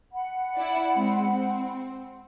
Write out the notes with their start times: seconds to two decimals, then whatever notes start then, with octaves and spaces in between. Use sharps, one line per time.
0.12 F#5 B5
0.55 E4 D5
0.96 G#3 C4
1.29 C4